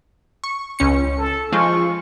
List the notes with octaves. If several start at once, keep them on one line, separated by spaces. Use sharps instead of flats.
C#6
C#2 C#4 C#7
A4
F3 G#3 F4 C#6